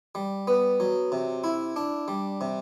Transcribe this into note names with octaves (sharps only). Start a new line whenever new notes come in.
G3
B3
F#3
C3
E4
D4
G3
C3